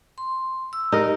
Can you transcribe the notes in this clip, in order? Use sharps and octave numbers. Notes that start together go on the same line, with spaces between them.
C6
E6
D#4 G4 A#4